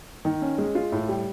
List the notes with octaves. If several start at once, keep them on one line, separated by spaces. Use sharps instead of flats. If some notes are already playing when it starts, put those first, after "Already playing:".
D#3
C#4
G#3
F4
A2
G3